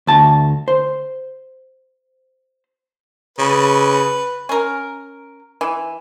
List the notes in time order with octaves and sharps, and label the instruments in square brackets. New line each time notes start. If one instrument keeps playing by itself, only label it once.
[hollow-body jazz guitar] D2 A5
C5
[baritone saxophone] C#3 [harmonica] B4
[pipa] C#4 A#4
E3